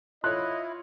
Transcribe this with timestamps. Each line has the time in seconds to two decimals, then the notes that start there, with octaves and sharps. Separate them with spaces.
0.24 E4 F4 C#5 D#5 C6 F#6